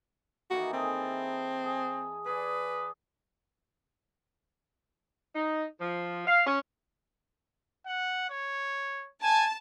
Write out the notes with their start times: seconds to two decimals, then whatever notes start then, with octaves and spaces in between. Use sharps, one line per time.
0.50 D#3 E3 A#3 F#4
0.73 C4 E4 G#4 A4
1.64 G#4
2.26 G#4 B4 D5
5.34 D#4
5.80 F3
6.26 F5
6.46 C#4
7.87 F#5
8.30 C#5
9.23 G#5 A5